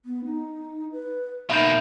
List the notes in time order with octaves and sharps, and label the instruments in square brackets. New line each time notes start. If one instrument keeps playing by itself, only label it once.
[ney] B3
D#4
B4
[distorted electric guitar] B2 A#3 [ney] D#4 [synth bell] E5 B5 G6